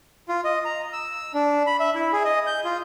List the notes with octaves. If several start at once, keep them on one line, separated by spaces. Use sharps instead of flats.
F4
D#5
A#5
E6
D4
B5
E5
E4
G#4
D#5
G6
F4